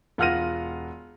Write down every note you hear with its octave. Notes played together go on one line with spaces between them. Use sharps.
E1 F4 F#5 F6 A#6 D#7